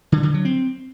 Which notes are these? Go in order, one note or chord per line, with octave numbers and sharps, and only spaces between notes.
D3
D3
F#3
C4